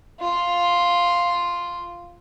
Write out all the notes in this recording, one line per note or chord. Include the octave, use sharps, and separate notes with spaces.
F4